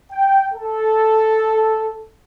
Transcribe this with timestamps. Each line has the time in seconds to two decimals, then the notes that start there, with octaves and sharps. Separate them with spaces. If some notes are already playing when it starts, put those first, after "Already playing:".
0.11 G5
0.54 A4